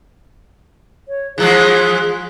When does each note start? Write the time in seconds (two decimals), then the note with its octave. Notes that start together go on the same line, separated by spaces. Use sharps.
1.08 C#5
1.38 E3 F3 G#3 G#4